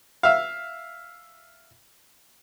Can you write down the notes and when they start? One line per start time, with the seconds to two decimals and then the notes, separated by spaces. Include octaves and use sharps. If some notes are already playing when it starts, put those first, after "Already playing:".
0.23 E5 F5